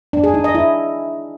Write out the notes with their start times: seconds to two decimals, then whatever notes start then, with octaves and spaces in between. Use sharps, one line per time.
0.13 D4
0.24 G#4
0.34 D#4
0.44 D#5
0.55 E4